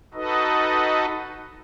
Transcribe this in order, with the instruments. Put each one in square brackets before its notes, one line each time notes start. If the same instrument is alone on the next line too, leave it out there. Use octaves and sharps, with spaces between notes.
[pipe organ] D#4 F#4 A4 B4 D#5